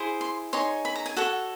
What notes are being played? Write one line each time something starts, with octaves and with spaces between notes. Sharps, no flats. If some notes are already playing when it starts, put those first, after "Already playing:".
Already playing: E4 G#4 C5
C6
D#4 G#4 C#5 C6
B5
A#5
G#5
F#4 A4 C#5 F#5